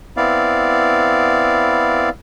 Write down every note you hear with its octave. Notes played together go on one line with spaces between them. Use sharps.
B3 C4 E4 D5 F5